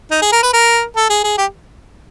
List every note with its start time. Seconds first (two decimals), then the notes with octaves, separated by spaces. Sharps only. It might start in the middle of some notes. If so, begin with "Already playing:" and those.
0.11 D#4
0.22 G#4
0.32 A#4
0.43 B4
0.53 A#4
0.96 A4
1.10 G#4
1.24 G#4
1.38 G4